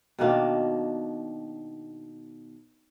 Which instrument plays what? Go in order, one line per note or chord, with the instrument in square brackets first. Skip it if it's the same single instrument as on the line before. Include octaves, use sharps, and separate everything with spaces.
[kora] B2 D#3 A#3 D4